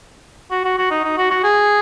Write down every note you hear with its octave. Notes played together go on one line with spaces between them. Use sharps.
F#4
F#4
F#4
D#4
D#4
F#4
F#4
G#4